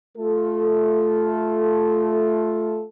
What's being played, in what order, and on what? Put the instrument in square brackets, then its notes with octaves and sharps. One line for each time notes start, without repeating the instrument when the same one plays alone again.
[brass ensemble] A3 F4 A4